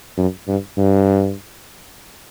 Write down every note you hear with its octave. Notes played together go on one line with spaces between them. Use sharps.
F#2
G2
G2